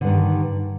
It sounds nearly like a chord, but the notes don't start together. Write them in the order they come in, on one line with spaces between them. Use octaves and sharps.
D3 G2 D#3